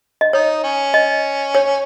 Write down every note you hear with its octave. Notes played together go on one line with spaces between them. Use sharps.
D#5
D#4 C#5
C#4
D#5
C#5